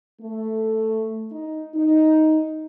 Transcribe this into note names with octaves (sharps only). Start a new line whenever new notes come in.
A3
D#4
D#4